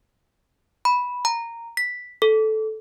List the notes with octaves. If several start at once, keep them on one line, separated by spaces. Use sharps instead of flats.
B5
A#5
B6
A4